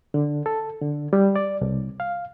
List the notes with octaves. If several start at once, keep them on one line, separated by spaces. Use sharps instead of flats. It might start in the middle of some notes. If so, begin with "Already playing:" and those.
D3
A4
D3
G3
D5
C2
F5